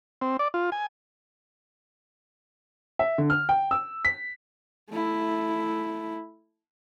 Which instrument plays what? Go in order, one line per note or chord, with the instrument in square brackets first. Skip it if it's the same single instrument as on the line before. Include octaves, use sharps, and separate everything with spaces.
[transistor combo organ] C4
D5
F4
G#5
[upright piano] E5
D3
F6
G5
E6
B6
[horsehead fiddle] A3 E4